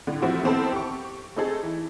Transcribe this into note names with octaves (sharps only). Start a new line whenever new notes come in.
A2 D3
E3 F3 A3 C4 E4 F#4
D#3 B3 C4 E4 A4
G4 C#6
A3 C4 D#4 G#4 A4
E3